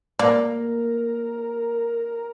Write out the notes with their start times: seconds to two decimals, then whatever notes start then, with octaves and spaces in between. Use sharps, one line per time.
0.19 A#3 A#4 D5